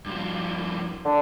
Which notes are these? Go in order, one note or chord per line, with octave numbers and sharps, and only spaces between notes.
G2 F3
D3